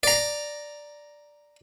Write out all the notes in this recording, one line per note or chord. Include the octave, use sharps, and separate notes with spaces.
D5 A#5